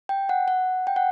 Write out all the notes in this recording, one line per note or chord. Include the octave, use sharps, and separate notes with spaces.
G5
F#5
F#5
G5
F#5